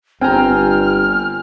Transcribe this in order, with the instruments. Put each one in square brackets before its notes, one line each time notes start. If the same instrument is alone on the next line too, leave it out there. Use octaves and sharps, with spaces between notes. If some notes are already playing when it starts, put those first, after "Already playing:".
[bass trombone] G1 [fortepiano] C4 A#5 [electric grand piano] G5 G#5 [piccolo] F6